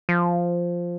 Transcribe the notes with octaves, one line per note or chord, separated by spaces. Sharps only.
F3